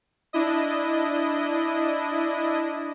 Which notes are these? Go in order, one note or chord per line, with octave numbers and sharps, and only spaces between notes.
D4 E4 D#5